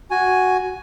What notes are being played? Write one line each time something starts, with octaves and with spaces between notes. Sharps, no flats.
F#4 G#5